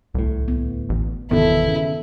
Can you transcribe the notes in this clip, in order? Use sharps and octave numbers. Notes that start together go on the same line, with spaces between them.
D1 C2 A2
B3
A1
G1 E2 B2 D#3 B3 E4 A4
C#3